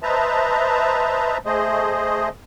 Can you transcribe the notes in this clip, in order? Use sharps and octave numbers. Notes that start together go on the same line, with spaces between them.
B4 C5 D#5 E5 A5 A#5
A3 G#4 C5 D#5